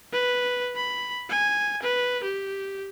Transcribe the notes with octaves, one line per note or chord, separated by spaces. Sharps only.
B4
B5
G#5
B4
G4